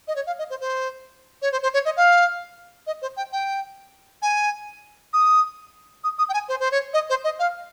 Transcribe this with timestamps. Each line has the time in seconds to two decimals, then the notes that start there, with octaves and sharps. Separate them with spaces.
0.08 D#5
0.16 C#5
0.27 F5
0.39 D#5
0.50 C5
0.61 C5
1.42 C#5
1.52 C5
1.63 C5
1.74 C#5
1.85 D#5
1.97 F5
2.87 D#5
3.02 C5
3.17 G5
3.32 G5
4.22 G#5
5.13 D#6
6.04 D#6
6.18 D#6
6.29 G5
6.34 G#5
6.49 C5
6.60 C5
6.71 C#5
6.94 D#5
7.10 C5
7.24 D#5
7.39 F5